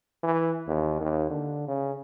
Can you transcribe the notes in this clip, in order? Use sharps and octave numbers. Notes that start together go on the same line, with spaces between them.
E3
D#2
D#2
D3
C#3